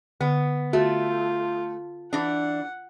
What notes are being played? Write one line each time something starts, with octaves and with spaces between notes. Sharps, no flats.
D3 B3
A3 F4 F#4
E3 D4 F#5